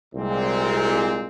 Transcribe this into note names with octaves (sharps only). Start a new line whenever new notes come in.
C2 A#2 G#3 C4